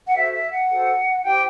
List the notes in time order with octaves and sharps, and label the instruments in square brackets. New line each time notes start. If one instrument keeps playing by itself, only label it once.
[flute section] F#5
F#4 A4 C5 E5
E5
F#5
F#4 A4 C5
E4 G4 C5 G5